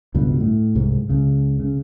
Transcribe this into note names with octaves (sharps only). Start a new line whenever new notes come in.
C#2 G2 B2
A2
C2 G#2
C#2 C#3
C#3